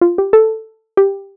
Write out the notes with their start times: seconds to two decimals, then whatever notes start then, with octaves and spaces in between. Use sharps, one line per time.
0.01 F4
0.18 G4
0.33 A4
0.97 G4